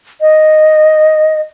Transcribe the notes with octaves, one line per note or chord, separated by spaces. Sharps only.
D#5